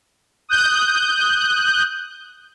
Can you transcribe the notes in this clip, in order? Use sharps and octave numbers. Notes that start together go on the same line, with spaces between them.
D#6 F#6 G6